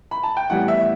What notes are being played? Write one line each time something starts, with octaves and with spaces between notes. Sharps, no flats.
B5
A5
G5
A2 E3 G3 B3 F#5
E5